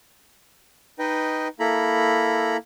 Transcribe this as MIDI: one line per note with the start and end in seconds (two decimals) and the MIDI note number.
0.99 1.48 63
0.99 1.48 71
0.99 1.48 75
0.99 1.48 79
1.60 2.57 58
1.60 2.57 64
1.60 2.57 69
1.60 2.57 82
1.60 2.57 83